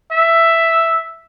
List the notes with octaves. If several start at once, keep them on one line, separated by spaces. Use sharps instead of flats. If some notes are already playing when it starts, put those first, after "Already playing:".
E5